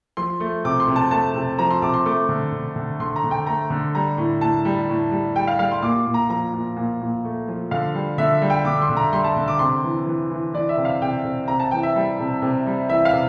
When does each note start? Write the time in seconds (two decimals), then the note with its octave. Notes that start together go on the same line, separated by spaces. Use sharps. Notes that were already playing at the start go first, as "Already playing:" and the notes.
0.17 F3 C6
0.40 A3
0.64 C3 D6
0.80 C6
0.88 C3
0.96 A5
1.11 A3 A5
1.35 C3
1.59 F3 A#5
1.70 C6
1.82 C3 D6
1.94 C6
2.05 A3 D6
2.29 D3
2.52 D3
2.76 D3
3.00 D3 C6
3.16 A#5
3.24 D3
3.31 G5
3.46 A3 A#5
3.70 D3
3.95 G3 A#5
4.17 A2
4.41 A2 A5
4.65 G3
4.89 A2
5.11 G3
5.35 G3 G5
5.47 F5
5.59 G3 F5
5.71 C6
5.82 A#2 D6
6.06 A#2
6.14 A#5
6.29 F3 A#5
6.54 A#2
6.76 A#2
7.01 A#2
7.25 A3
7.48 F3
7.71 D3 F5
7.95 G3
8.18 D3 E5
8.42 G3
8.50 G5
8.65 D3 D6
8.82 C6
8.90 D3
8.97 A#5
9.13 G3 C6
9.24 A5
9.36 D3
9.48 D6
9.59 C3 C6
9.84 E3
10.06 E3
10.31 E3
10.53 E3 D5
10.69 E5
10.77 C3
10.85 F5
11.01 C3 G5
11.25 C3
11.48 C3 A#5
11.60 A5
11.71 E3 G5
11.83 E5
11.96 G3
12.20 C3
12.42 C3
12.66 G3
12.89 E3 E5
13.05 F5
13.13 C3